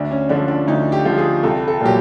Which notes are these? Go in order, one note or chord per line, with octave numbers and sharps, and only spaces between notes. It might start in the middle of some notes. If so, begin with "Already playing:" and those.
Already playing: D2 D4
C#4
D3 F3 D4
D4
D2 D#4
G4
D3 F3
G#4
C2 A4
A4
A#2 F#3 G4